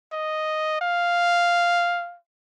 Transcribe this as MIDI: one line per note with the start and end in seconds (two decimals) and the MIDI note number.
0.12 0.79 75
0.81 2.17 77